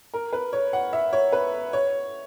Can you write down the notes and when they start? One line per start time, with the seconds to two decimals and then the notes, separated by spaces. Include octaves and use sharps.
0.14 A#4
0.33 B4
0.53 C#5
0.73 F#5
0.93 E5
1.13 C#5
1.32 B4
1.73 C#5